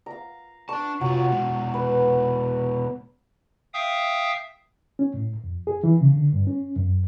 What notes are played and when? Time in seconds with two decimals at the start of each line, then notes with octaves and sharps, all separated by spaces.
0.06 F5 A#5
0.69 D4 A5 C#6
1.01 C3 F#3 F4
1.28 B2 G#3
1.74 B4
3.74 E5 F5 G5 D#6
4.99 C#4
5.14 A2
5.44 F2
5.67 G#4
5.84 E3
6.01 C#3
6.13 D3
6.33 G2
6.47 C#4
6.76 F#2